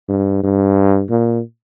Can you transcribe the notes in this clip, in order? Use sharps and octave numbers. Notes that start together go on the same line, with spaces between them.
G2
G2
A#2